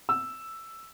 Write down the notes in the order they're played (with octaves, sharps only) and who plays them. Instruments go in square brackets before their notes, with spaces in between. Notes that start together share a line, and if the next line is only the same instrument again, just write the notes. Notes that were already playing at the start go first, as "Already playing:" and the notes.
[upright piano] E6